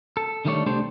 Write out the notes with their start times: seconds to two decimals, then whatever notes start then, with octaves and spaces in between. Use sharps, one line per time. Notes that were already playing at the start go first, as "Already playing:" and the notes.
0.17 A4
0.45 D3 D#3 G3 A3 D4 C#5
0.66 C2 A3 D4 G4 A4 C5